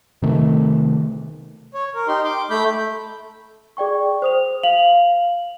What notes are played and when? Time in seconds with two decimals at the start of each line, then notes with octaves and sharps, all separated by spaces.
0.22 C3 D#3 A3
1.74 C#5
1.94 A#4
2.08 D#4 G4 C6
2.25 C6 D6
2.50 A3 B5 G6
3.77 G#4 D5 G5 C#6
4.22 C5 D#6 F7
4.63 F5 F7 F#7